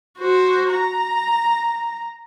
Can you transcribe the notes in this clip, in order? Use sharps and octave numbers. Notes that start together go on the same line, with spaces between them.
F#4 C5
A#5